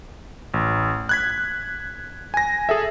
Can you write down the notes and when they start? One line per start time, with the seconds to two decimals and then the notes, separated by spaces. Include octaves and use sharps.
0.54 A1
1.09 F#6 G#6 B6
2.34 G#5 A#6
2.69 G#4 A4 E5